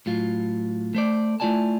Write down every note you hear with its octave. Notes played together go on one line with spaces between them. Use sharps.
A2 F#3 F4
A3 C5 D5
A3 E4 F4 D5 G#5 A5